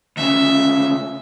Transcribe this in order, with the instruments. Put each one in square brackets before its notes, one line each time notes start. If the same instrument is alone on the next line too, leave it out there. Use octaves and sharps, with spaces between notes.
[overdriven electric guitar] D2 C#3 [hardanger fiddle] E5